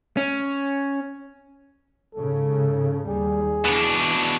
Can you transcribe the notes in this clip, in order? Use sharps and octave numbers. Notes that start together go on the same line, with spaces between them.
C#4
G#2 C#3 A4
D#2 G3 G#4
B2 E3 D4